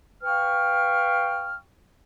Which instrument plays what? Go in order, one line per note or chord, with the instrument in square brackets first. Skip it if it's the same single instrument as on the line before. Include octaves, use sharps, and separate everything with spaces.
[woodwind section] B4 F5 G5 C#6 F6